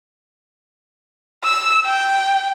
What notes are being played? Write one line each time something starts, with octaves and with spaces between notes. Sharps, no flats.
E6
G5